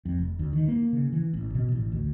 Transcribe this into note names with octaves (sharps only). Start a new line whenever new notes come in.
F2
F1
D2
D#3
A#3
C#3
E3
A1
B2
A1
D2